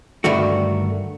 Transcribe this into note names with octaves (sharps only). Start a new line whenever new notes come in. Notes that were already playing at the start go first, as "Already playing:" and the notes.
G2 D3 D#3 A3 F#4